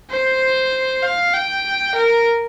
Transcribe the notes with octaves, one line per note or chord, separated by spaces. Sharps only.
C5
F5
G5
A#4